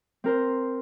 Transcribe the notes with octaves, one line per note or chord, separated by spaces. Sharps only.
C4 A#4 C5